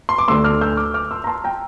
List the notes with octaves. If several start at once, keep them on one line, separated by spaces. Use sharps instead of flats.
C6
D6
D2 D3 A3 C6 E6
D6 F6
E6 G6
D6 F6
D6 F6
C6 E6
A#5
A5 C6
G5 A#5